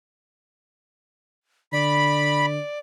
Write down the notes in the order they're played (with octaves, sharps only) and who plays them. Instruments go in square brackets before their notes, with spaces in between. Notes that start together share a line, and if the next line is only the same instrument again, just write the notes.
[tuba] D3 [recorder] D5 [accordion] B5